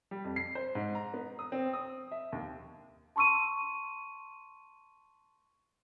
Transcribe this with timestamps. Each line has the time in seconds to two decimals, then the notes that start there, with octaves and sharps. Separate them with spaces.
0.11 G3
0.24 F2
0.36 C7
0.55 C5
0.75 G#2
0.95 A#5
1.14 B3
1.39 D#6
1.52 C4
1.73 D#6
2.11 E5
2.32 D#2
3.16 A5 C6 C#6 E6 D#7